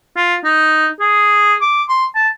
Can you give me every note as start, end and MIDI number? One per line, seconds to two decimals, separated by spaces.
0.16 0.36 65
0.44 0.88 63
1.00 1.54 68
1.61 1.83 86
1.89 2.05 84
2.15 2.28 81